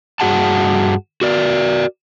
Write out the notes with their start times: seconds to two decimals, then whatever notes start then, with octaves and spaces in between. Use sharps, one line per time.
0.20 G2 B2 F#4 G#4 F#5 A5
1.21 F#4 A#4 D5